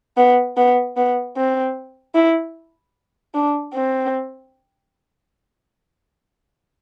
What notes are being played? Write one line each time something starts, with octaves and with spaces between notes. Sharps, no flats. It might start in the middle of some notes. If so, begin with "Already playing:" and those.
B3
B3
B3
C4
E4
D4
C4